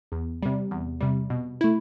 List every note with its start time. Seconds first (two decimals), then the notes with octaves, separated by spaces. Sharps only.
0.12 E2
0.43 C3 G3
0.71 E2
1.01 C3 G3
1.30 B2
1.61 A3 E4